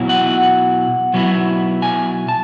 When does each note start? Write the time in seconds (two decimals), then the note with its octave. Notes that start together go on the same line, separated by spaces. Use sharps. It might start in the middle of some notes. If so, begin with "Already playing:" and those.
Already playing: B2 F#3 B3 E4
0.09 F#5
1.13 B2 F#3 B3 E4
1.82 G#5
2.29 A5